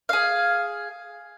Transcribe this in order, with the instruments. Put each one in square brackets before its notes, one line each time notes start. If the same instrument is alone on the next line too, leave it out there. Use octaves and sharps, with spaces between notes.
[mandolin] G#4 F5